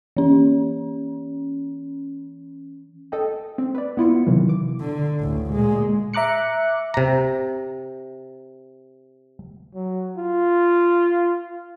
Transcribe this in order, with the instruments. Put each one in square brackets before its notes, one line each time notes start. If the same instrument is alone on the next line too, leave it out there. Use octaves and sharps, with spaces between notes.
[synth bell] E3 C#4
[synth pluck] A4 D#5 G5
C4
B4 D5
B3 E4 F4 C#7
C3 D#3 E3 F#3
D6
[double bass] D3
A1 D2
A#2 G#3
[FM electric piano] E5 A#5 D6 F#6 C#7
[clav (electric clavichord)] C3 A#5
[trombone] F#3
F4